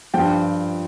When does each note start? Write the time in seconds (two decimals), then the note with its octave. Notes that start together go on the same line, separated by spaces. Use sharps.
0.14 G2 F3 G5